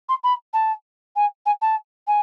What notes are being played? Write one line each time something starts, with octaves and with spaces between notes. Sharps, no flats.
C6
B5
A5
G#5
G#5
A5
G#5